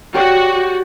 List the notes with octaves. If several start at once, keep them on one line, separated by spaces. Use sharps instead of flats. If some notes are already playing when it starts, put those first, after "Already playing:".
F#4 G4 C#5 D5